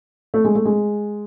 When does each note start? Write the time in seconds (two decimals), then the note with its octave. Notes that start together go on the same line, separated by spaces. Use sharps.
0.34 A3
0.45 G#3
0.55 A3
0.65 G#3